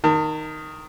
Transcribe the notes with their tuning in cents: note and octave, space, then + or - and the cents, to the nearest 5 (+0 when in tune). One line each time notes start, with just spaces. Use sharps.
D#3 +0 A5 +45